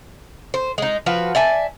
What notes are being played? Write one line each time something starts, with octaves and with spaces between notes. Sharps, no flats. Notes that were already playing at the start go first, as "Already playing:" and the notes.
C5
G#3 D#4
F3 F#4 B4
D5 E5 G#5 A5